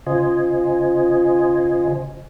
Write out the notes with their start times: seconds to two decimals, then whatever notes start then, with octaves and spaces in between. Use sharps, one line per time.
0.07 C#3 F4 C5 D#5 G#5